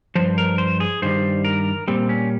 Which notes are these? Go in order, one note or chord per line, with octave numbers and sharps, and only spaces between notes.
G2 F3 C5
A#4
C5
G#4
G2 D#3 G3 C5
A#4
A#2 G3 C4
C#4